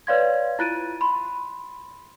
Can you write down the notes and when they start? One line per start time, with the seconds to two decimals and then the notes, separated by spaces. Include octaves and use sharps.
0.07 B4 C#5 D5 F5 C6 G#6
0.59 E4 F4 F#6 A6 D7 D#7
1.01 B5 C6